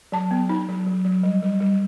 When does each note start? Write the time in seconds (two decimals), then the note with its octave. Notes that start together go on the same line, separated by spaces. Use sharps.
0.12 F#3 A5
0.31 B3
0.49 D#4
0.69 F#3
0.86 F#3
1.05 F#3
1.23 G3
1.42 G3
1.60 G3